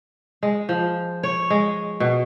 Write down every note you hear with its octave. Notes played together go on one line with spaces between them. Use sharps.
G#3
F3
C#5
G#3
B2